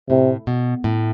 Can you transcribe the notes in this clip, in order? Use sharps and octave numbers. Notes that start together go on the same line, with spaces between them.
A2 C3
B2
A2